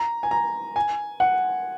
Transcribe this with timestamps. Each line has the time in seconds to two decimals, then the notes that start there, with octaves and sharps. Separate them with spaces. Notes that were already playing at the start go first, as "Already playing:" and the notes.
Already playing: A#5
0.23 G#5
0.31 A#5
0.76 G#5
1.20 F#5